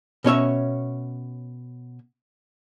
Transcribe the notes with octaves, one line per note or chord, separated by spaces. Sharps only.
B2 C#4 C#5 E5